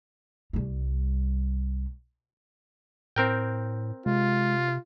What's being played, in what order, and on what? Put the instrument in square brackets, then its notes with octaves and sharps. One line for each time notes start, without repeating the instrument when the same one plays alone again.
[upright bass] C2 G3
[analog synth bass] A2 [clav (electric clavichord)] C4 A#4 G5
[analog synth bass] C3 [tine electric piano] G#3 [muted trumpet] F4